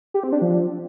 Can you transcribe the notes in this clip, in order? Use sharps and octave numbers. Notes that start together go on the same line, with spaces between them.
G4
C4
D4
F3